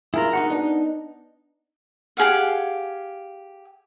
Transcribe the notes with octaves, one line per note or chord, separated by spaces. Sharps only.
E4 F4 G#4 A#4 A#5
D#4 F#4 F#5
B3 D4 D#4
G4 G#4 F5 F#5